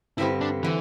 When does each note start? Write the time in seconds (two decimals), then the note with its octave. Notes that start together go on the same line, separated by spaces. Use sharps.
0.18 G2 D3 C4 E4 G4
0.41 D4
0.63 D3 E3